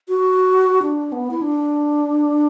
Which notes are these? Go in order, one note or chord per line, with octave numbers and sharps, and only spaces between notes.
F#4
D4
B3
E4
D4